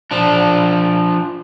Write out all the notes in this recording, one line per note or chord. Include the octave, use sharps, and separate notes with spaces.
F3 D4